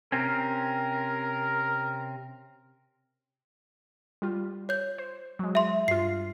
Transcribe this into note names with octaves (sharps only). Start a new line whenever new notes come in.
C3 C4 C#4 A#4
G3 F4
C#5 G6
C5
F#3 G#3
E5 C6
G2 F4 C7